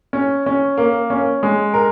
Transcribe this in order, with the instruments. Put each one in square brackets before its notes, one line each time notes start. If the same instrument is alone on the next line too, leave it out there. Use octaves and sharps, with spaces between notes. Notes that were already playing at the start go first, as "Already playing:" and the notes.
[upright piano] C#4
C#4
A#3
C#4
G#3
A#4